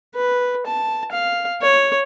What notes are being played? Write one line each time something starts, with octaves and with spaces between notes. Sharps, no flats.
B4
A5
F5
C#5